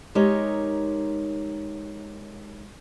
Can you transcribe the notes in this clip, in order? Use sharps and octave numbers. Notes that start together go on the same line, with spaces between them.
G#3 D#4 G4 A#4 C#5